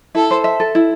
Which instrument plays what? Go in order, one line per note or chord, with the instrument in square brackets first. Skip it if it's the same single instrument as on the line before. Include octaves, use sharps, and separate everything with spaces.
[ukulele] E4 [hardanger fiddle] A4
[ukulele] C5
E5
A4
E4